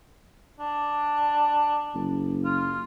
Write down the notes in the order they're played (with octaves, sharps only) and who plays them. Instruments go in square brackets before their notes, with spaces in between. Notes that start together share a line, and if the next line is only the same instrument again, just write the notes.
[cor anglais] D4
[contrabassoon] F#1
[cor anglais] F4